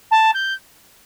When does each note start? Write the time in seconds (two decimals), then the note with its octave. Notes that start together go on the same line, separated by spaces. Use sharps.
0.11 A5
0.34 G6